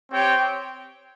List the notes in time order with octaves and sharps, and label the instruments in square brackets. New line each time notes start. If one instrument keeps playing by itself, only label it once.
[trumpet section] C4 G4 C#5 G5